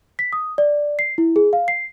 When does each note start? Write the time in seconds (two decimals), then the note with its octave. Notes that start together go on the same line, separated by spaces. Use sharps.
0.19 B6
0.33 D#6
0.58 D5
0.99 C7
1.18 E4
1.36 G#4
1.53 F5
1.68 C7